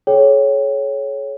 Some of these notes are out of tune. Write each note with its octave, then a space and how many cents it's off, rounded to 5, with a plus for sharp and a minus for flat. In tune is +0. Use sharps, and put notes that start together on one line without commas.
G#4 +40 C#5 +0 G5 +0